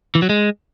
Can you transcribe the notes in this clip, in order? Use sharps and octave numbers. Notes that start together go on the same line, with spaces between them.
E3
F#3
G#3